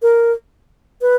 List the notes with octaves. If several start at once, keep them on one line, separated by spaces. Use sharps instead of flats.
A#4
B4